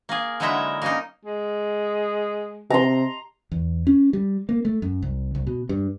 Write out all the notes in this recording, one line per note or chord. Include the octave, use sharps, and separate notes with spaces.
A#3 G#4
D3 F#3 G#3 D#4 E4 E5
A#3 C#4 D#4
G#3
C3 A#5 C6
E2
C#4
G3
A#3
A3
F#2
C2
C2
B2
G2